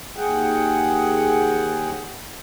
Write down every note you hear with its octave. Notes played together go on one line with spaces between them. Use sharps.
D#2 G#4 F#5 G5